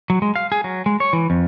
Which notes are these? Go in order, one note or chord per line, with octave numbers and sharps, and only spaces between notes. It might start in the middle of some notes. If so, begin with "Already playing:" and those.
F#3
G#3
F5
G#4
F#3
G#3
C#5
E3
F2